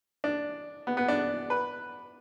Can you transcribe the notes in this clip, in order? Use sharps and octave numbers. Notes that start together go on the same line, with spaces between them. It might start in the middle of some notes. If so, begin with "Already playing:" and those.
D4
B3
B3
D4
B4